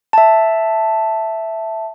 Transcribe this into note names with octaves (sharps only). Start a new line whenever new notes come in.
E5 A5